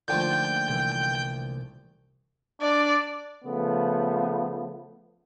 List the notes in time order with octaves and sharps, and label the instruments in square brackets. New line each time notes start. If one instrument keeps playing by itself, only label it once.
[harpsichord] D3 F3 A3 [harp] A#3 D#4 F4 [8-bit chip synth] G5 G6
[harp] C2 C3 E3
[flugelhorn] D4 [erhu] D5
[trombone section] C#3 F3 A3 B3